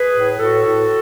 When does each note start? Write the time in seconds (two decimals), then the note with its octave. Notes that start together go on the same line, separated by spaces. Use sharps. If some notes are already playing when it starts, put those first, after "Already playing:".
Already playing: G#4 B4
0.15 A2
0.39 A2 F#4 A4
0.65 A2